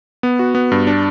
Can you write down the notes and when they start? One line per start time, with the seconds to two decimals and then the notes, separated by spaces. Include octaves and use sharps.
0.23 B3
0.39 F#4
0.55 B3
0.72 G2
0.87 D4